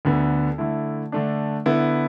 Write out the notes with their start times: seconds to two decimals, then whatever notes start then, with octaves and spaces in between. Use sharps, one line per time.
0.05 D2 D3 B3
0.58 D3 A3 E4
1.12 D3 A3 D4
1.66 D3 B3 E4